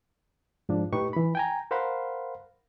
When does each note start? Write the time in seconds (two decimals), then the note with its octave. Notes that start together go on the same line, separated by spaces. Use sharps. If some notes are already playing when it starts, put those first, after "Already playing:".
0.69 G#2 F3 D4
0.93 A2 D#4 G4 B4 C#6
1.13 E3 B5
1.35 G5 G#5 A#5
1.71 A#4 C5 F5 F#5 B5 C6